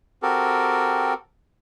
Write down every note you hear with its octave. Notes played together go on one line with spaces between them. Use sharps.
C4 F#4 G4 A4 A#4